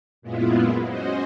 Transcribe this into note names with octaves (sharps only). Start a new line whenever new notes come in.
F#2 A#2 G#3 B3 E4 F4
C#4 F#4 C5 D#5